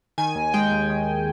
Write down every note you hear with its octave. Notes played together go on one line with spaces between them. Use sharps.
D#3 G#5
D#2
G#3 G5
D#2
D#3